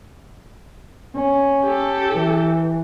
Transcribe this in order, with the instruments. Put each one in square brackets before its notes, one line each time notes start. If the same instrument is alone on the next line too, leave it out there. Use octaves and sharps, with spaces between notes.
[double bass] C#4
[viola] G4 A4
[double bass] E3